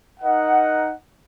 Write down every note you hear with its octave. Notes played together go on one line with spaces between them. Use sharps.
D#4 A#4 D#5 F#5